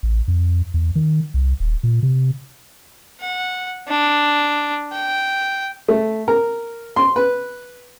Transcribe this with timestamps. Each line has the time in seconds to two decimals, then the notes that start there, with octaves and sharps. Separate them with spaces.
0.03 A1
0.28 F2
0.74 E2
0.95 D#3
1.34 C2
1.60 D#1
1.83 A#2
2.03 C3
3.21 F#5
3.88 D4
4.92 G5
5.88 A3
6.28 A#4
6.96 C6
7.16 B4